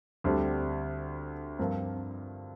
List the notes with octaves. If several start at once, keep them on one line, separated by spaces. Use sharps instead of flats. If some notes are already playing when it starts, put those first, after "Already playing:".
D2 D3 G3 C4
G2 F3 C4 F4 A#4